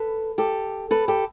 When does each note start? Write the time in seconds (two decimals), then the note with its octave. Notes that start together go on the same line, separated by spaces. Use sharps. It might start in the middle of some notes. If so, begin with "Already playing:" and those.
Already playing: A4 B4
0.38 G4 A4
0.91 A4 B4
1.08 G4 A4